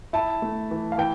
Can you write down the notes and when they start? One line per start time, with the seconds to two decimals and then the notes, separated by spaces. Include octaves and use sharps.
0.13 E4 A5
0.42 A3
0.71 E3
0.92 F5
0.98 E3 G5